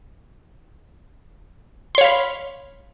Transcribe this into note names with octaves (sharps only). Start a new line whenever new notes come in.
C#5 F5 B5 C6